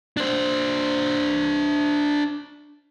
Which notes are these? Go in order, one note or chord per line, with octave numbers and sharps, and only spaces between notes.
D4 C5